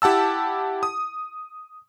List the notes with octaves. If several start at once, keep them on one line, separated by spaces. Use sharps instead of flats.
E4 G4 F#5 A5 E6
D#6